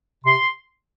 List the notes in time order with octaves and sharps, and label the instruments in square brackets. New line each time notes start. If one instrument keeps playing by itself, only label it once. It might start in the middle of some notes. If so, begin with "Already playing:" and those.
[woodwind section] C3 C6